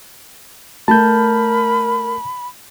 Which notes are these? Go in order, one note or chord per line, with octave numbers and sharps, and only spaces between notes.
A3 A#4 A5 B5 G6